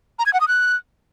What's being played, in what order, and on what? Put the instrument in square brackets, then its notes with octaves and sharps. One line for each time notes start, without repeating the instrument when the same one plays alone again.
[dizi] A#5
G#6
F#5
D#6
F#6